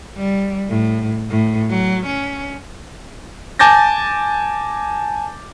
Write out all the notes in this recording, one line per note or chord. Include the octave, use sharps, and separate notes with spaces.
G3
A2
A2
F#3
C#4
G#5 A5 D6 G6 A6 A#6